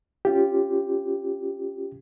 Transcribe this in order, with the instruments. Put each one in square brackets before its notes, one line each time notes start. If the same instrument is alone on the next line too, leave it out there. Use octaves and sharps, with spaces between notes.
[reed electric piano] C#4 F4 G4